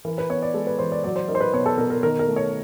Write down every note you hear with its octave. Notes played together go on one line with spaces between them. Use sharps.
E3 A#4
B4
B3 C#5
D5
G#3 A4
B4
E3 C5
D5
F#3 D5
C5
D#4 A#4
C5
B4
B2 C#5
A4
B2 A#4
A#4
D#3 A#4
A#4
A3
C#5